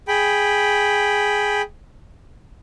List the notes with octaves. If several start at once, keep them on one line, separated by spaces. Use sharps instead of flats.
G#4 G5 B5